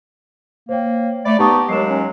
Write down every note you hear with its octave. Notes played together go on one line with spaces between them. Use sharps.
A#3 C5 C#5 G5
A3 D5 B5
B3 D#4 G4 A5 C#6 D#6
D#2 F#3 G#3 C7 E7
C#4